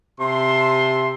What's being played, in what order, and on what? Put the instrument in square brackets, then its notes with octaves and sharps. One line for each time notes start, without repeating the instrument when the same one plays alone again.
[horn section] C3 E5 A5 C6